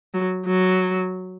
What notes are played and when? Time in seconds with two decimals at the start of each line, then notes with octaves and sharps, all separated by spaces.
0.14 F#3
0.46 F#3